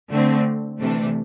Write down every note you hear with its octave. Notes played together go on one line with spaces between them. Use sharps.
D3 A3 C4
C3 E3 A3 D4